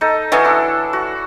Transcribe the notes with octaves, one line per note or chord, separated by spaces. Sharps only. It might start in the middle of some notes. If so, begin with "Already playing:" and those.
D#4 A4 D#5
E3 F#3 C#4 A4 D#6
D4 E4
F#4